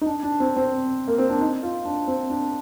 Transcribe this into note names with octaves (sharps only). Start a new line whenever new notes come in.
D#4
D4
D4
C4
C4
A#3
C4
D4
D#4
F4
D4
C4
D4